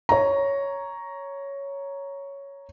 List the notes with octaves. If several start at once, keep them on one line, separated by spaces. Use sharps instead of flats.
C#5 A#5